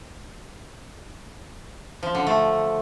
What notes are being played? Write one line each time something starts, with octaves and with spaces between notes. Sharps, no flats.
F3
D3
A3